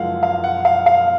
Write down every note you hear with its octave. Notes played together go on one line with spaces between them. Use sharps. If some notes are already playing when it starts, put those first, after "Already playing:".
Already playing: F#1 F#2 F3 G#3 F5 F#5
F5
F#5
F5
F5